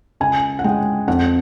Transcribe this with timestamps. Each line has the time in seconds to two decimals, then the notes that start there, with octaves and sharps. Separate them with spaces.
0.20 C#2 G#5
0.59 F#5
0.64 G#3 G5
1.07 F2 F#5